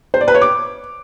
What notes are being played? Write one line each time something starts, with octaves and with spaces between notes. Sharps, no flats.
C5
D5
B4
C#5
D6